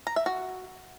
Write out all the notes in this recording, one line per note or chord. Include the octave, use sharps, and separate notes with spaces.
A#5
E5
F#4